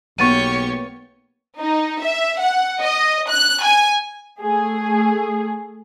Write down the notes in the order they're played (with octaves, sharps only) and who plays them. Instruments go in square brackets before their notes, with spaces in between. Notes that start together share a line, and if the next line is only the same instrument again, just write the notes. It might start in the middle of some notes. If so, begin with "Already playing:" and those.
[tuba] B1 [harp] A#3 B3 [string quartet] G4 C#5 [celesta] C#6 A6 D#7
[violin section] D#4
E5
F#5
D#5
F#6
G#5
[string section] A3 G#4